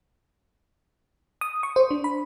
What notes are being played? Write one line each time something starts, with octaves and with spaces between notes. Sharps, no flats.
D#6
C#6
C5
D4
B5